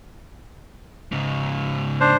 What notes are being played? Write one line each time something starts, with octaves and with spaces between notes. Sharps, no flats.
G#2 C#3
D4 C5